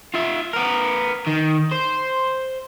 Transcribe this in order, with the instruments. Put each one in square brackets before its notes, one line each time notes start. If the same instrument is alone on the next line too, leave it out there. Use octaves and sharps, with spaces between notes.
[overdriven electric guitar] F4 E5
B3 A#4
D#3
C5